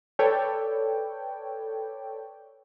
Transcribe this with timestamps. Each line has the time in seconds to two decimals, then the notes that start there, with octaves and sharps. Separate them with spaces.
0.19 A4 B4 C#5 D5 G5